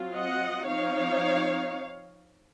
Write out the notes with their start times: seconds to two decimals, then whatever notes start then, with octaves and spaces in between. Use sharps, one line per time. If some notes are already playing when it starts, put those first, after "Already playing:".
Already playing: F#3 C4 F4
0.15 D#5 F#5
0.68 F3 C4 D#4 C#5 F5